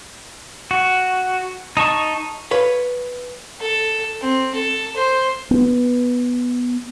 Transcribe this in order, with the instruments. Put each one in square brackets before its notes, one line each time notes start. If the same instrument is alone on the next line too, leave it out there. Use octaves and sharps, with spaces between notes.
[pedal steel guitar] F#4
D#4 A5 C#6
[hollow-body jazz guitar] B4 C#5 F5
[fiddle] A4
C4
A4
C5
[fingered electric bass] B3